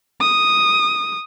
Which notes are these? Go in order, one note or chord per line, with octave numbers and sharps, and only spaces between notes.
D#6